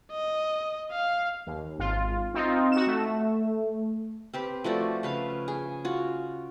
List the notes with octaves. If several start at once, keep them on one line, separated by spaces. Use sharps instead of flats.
D#5
F5
D#2
G#1 F4
C4 D#4 F4
F#4 E7
A3
C4 G4 B4
F3 A3 F#4 D5
C#3 B4 F5
G#4
F4 F#4